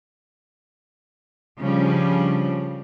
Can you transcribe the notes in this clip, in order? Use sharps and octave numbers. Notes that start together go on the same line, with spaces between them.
C#3 F3 G3 D4